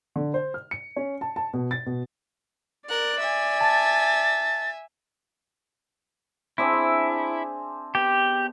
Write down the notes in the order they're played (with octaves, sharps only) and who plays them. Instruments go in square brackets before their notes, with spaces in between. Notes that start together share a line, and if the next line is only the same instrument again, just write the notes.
[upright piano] D3
C5
F6
C#7
C#4
A5
A5
B2
A6
B2
[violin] A#4 F#6 [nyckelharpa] D5
[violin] E5 G#5
[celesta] A5 [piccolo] A6
[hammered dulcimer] C4 D4 G#4 [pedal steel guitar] E4
[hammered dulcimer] E5
[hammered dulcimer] B3 [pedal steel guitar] G4